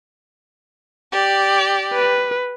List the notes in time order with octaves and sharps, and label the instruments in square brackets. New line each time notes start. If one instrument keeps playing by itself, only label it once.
[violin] G4 D5
[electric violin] B4